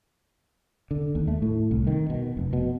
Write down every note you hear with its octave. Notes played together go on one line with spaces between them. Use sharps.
D3
D#2
A3
A2
C2
D#3
B2
F1
B2